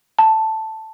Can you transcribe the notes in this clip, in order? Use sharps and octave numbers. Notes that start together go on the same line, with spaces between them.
A5